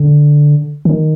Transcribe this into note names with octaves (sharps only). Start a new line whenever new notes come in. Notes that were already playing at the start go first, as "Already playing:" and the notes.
Already playing: D3
D#3